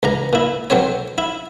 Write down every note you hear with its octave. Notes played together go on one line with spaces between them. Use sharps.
C#2 E3 A#5
A#2 E4
B1 F#3 C4 C5 C#5
E4